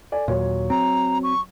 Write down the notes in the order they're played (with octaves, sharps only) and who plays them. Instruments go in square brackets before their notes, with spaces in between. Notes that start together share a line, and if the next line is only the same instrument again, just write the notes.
[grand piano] A4 D5 G#5
[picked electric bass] D#2 A#2 [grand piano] F#3 C#5
[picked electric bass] C4 [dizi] A#5
[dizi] C#6